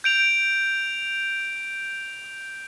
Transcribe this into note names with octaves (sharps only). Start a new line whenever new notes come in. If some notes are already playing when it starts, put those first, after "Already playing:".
G6 D7 F7